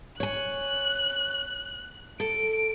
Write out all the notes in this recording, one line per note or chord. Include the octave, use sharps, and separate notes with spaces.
C#5 G#5 F#6
A4 D7